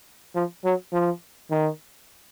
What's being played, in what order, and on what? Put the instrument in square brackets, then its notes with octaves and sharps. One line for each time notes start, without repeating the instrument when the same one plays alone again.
[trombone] F3
F#3
F3
D#3